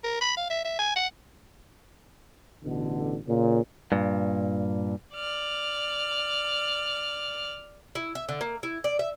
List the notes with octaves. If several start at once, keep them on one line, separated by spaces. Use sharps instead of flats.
A#4
B5
F5
E5
E5
G#5
F#5
A1 B2 D3
A#2 C#3
G2 A#2
D5 F6
E4
E5
D3
A#3
E4
D5
E5